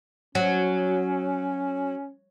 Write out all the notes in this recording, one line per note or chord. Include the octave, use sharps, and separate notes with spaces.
F#3 C#4